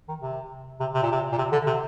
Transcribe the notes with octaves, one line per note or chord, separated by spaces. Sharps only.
D#3
C3
C3
C3
A#2
C3
A#2
C3
D3
C3